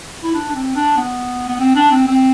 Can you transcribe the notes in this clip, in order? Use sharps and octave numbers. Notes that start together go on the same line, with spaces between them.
E4
D4
D4
C4
D4
B3
B3
C4
D4
C4
C4